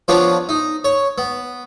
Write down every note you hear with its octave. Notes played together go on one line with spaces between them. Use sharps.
F3 B3 D4 F4 C#5
D#4
C#5
B3